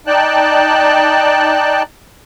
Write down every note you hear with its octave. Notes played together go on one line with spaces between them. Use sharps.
D#4 D5 G5 A5 F#6